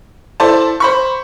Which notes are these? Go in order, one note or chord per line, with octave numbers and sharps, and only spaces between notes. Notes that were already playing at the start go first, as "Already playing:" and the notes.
E4 A4 C5 D5 A5
C5 B5 C#6